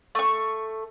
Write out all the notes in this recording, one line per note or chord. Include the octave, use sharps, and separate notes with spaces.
A3 C#6